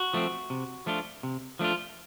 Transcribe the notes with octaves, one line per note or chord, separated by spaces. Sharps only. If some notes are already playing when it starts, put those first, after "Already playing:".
Already playing: F#4
F3 A3 C4
C3
F3 A3 D4 F4
C3
F3 A3 D4 F4